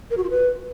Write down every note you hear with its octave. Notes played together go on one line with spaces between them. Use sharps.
A#4
F#4
F4
B4